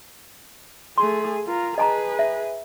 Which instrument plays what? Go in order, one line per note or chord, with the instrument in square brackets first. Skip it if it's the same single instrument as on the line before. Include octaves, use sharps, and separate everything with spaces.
[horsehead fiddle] A3 G#4 [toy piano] C6
[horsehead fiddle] F4 A#4
[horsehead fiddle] G#4 B4 [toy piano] D#5 A5 A#5
[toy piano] E5